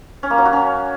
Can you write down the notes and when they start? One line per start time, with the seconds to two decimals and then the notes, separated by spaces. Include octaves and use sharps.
0.23 C#4
0.30 A#3
0.38 F#3
0.45 F#4
0.53 C#4